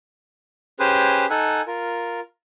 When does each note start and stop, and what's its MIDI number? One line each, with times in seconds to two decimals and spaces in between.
0.80 1.26 61
0.80 1.26 67
0.80 1.26 68
0.80 1.26 71
0.80 1.26 72
1.30 1.62 63
1.30 1.62 69
1.30 1.62 78
1.30 1.62 80
1.67 2.20 65
1.67 2.20 70